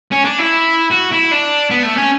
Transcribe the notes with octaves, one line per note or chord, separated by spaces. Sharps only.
C#4
D4
E4
F#4
E4
D4
B3
A3
C#4